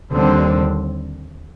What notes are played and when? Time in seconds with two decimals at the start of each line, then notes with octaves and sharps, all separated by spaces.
0.12 D#2 D3 G3 C4